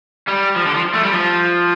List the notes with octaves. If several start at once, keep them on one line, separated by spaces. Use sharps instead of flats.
G3
F3
D3
F3
A3
G3
F3